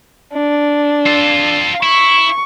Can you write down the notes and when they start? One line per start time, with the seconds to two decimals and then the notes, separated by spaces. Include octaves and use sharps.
0.33 D4
1.06 F4 A4
1.83 E4 C#6